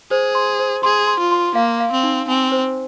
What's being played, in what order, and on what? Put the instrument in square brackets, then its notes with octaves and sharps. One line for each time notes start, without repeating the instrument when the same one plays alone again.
[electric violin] G#4 [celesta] C5
[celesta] C6
C5
[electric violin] G#4 [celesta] C6
[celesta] C6
[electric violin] F4
[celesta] C6
[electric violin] A#3 [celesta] F5
[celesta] F5
[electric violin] C4
[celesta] D#4
[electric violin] C4 [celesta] G#5
[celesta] C5